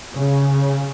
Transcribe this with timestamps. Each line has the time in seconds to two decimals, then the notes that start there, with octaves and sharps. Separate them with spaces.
0.16 C#3